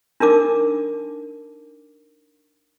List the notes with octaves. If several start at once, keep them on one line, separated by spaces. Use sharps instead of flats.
D4 D#4 A#4 D6